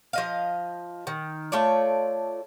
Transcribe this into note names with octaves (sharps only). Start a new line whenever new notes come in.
F3 D#5 F5
D#3
A3 F4 C#5 D5